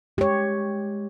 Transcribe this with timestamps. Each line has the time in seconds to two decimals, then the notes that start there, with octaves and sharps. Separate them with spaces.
0.18 G#3 G4 C#5